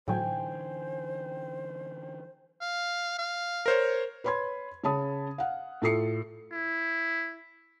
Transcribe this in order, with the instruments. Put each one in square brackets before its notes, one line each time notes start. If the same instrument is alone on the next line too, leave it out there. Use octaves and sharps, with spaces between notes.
[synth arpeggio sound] A2 F#3 [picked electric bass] D3 E3 [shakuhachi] C5 [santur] G5 G#5
[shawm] F5
F5
[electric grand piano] A#4 C5 C#5
[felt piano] B4 C#5 B5 C6 G#6
C#3 C#5 A5 B5 D#6
F5 F#5
A2 F4 A4 D#6 C7 C#7
[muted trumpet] E4